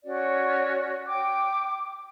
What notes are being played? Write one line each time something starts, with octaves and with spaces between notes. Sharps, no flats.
C#4 F#4 D5
G5 D6